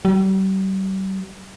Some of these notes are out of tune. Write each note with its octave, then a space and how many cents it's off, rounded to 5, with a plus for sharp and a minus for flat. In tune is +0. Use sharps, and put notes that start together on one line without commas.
G3 -40